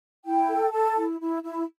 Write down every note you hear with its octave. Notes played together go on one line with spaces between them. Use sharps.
E4 G5
A4
A4 A5
E4
E4
E4